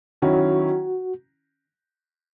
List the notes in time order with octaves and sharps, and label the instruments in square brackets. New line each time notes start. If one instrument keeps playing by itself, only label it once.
[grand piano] D#3 F#3 C#4 E4 [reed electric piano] F#4